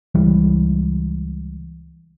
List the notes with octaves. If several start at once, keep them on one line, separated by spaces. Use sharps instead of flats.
C#2 E3 G3